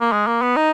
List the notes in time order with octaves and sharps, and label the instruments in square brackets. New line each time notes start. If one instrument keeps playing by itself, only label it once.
[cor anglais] A#3
G#3
A#3
B3
D#4